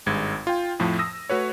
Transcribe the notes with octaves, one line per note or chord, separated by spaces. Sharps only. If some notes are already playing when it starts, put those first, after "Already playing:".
G#1 G2 G#3 G#6
F4 G5
F2 A2 F3
D#6 E6 A#6
A3 F#4 B4 C#5